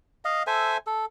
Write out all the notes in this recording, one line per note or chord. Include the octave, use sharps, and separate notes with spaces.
D#5 F5
A4 C5 E5 G#5
A4